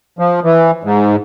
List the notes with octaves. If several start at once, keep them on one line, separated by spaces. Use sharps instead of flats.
F3
E3
G#2